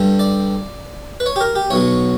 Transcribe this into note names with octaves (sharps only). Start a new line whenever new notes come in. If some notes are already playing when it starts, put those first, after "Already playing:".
Already playing: G2 D3 G3
D5
B4
C#5
G4
A#4
G4
B1 B2 F#3 C#5